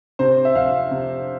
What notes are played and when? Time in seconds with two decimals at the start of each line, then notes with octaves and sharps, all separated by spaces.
0.19 C3 C5
0.45 E5
0.55 F2 F5
0.91 C3